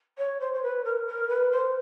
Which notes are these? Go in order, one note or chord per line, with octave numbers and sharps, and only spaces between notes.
C#5
C5
C5
B4
A#4
A#4
B4
C5